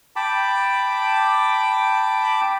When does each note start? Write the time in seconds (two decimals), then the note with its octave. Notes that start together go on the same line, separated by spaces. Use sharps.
0.16 G5 A5 B5 D6